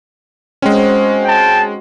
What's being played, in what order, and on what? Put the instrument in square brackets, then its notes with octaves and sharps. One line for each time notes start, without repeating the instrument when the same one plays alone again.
[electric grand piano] G#3 C#4 [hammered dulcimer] C4 D#4 F#4
[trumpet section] G5 A5